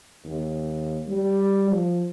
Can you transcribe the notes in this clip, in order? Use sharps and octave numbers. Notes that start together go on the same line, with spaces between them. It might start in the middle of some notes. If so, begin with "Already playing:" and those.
D#2
G3
F3